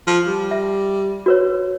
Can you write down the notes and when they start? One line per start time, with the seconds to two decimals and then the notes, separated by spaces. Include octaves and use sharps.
0.07 F3
0.27 G3
0.51 E5
1.26 F#4 B4 C#5